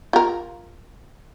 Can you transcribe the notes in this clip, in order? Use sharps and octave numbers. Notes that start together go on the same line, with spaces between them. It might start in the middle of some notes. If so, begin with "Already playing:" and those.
F4 A#4